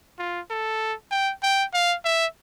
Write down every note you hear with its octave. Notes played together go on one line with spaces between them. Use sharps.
F4
A4
G5
G5
F5
E5